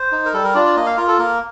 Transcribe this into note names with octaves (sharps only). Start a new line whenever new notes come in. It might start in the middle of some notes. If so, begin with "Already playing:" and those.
Already playing: C5
D#4
A#4
G3 A4
A#4
D4 F4 D5
D5
A#3 D#5
F5
F4 A#4
A4
A#3 A#4